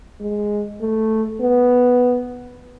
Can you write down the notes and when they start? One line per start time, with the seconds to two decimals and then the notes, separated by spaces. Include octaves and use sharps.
0.21 G#3
0.81 A3
1.41 B3